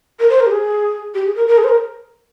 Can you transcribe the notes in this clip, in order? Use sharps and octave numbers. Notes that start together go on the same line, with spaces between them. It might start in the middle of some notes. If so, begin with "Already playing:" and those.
A#4
C5
A#4
G4
G#4
G4
G#4
A#4
A#4
G#4
C5
A#4